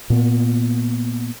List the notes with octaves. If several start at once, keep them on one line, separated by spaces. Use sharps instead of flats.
A#2 A#3 B3